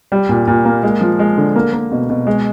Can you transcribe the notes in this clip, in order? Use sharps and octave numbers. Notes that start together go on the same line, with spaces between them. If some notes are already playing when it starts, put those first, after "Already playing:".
G3
A#2
A#2
A#3
G#3
F3
G#3
D3
A#3
A#3
B2
B2
G#3